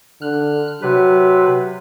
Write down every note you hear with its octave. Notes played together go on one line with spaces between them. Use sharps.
D3 F6 F#6
C3 F#3 B4